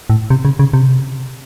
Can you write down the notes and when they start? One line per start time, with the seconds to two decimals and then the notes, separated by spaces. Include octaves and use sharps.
0.10 A2
0.30 C3
0.45 C#3
0.59 C#3
0.73 C3